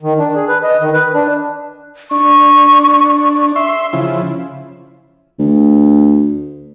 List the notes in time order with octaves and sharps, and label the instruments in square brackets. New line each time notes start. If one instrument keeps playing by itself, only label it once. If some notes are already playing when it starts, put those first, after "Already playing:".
[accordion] D#3
D4
G#4
B4
D#5
D#3
B4
D4
[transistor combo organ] D4 [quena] C#6
[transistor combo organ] E5 C6
C#3 F3 E4
[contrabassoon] D2